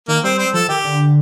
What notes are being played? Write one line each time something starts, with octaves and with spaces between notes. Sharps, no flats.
D#3 A#3
G3 C4
C4
F3 A4
D#3 G4
D3